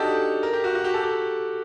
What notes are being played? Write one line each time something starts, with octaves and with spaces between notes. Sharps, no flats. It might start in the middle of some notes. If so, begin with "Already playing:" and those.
Already playing: D4 D#4 F#4 G4 A4
A#4
G4
F#4
F#4
G4
A4
G4